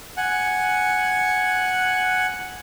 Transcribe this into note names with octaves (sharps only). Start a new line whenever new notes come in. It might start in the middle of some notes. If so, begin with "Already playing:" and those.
F#5 G#5 F#6